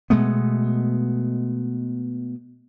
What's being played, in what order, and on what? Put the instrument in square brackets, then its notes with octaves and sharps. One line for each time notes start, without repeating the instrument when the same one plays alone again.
[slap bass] B2 G#3 A3 B3